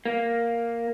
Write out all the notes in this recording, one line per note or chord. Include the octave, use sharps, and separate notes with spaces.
A#3